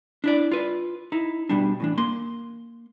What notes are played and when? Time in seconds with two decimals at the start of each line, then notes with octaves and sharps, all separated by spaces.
0.24 D4 E4 D5
0.52 F4 B4
1.12 D#4 E4
1.49 B2 G3 D4
1.80 A2 E3 D4
1.98 A#3 C6